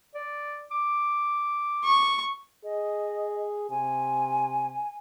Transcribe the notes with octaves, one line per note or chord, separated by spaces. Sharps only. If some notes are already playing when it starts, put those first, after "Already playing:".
D5
D6
C#6
G#4 D#5
C3 G#5